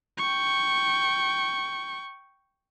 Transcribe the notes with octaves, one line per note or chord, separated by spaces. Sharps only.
G5 C#6